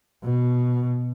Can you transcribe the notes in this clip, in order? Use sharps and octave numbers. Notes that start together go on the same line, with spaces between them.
B2